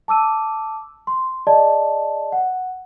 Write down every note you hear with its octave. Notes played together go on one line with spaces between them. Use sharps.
A5 D6 E6 D#7
C6
G#4 D5 D#5 A5
F#5